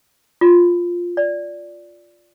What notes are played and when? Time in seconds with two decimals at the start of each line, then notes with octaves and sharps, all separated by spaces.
0.41 F4
1.17 D5